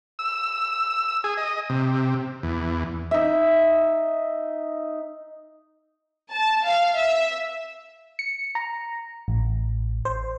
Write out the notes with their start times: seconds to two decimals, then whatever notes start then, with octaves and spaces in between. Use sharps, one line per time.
0.19 E6
1.24 G#4
1.37 D#5
1.70 C3
2.43 E2
3.11 D#4 E5
6.33 A5
6.68 F5
6.99 E5
8.19 C#7
8.55 A#5
9.28 A1
10.05 C5